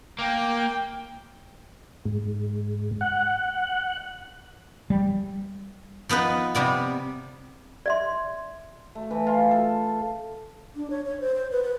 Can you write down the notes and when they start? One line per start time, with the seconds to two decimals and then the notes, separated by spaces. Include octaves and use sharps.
0.18 A#3 G5
2.05 G#2
3.01 F#5
4.90 G3
6.09 F3 B3 D#4 B4
6.55 C3 G3 B3
7.86 D5 E5 C6
8.95 A3
9.11 E3
9.27 F4
9.51 A4
10.76 D4
10.90 C#5
11.06 C#5
11.20 C5
11.35 C5
11.52 B4
11.64 B4